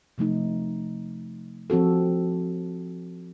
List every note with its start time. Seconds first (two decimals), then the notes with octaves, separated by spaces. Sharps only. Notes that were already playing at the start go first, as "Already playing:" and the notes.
0.18 C3 F3 A3 D#4
1.70 F3 C4 F#4 A4